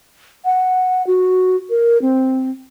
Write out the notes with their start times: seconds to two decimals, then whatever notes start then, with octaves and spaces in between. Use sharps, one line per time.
0.45 F#5
1.07 F#4
1.70 A#4
2.02 C4